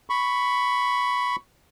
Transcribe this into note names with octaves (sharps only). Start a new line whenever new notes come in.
B5 C#6